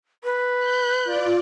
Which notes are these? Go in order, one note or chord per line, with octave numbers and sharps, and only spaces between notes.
B4
F#6 G6
F4 D5